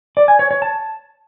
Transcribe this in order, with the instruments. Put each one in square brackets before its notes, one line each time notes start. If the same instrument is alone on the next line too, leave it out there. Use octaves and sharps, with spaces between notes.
[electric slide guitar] D5
G#5
C#5
C#5
A5